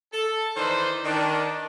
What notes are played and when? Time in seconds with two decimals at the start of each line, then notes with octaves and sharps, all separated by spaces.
0.13 A4
0.57 D#3 E3 D#4 B4 C5 D5
1.03 D#3 D4